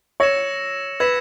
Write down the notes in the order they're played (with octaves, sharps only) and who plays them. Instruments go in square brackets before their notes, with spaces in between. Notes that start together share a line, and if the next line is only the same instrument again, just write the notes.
[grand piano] C#5 [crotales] E6 A#6 C#7 E7
[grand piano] B4 [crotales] E6 G#6 B6 E7